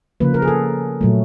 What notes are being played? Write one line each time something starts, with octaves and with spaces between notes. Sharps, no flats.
C#3 F3 A#3 B4
A#4
G#4
A4
A#2 F#3 A3